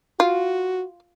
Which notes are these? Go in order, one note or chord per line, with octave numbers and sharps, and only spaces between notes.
F4 F#4